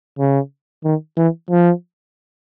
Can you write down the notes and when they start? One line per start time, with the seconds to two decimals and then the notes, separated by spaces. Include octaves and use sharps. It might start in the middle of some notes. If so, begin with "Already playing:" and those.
0.19 C#3
0.84 D#3
1.17 E3
1.50 F3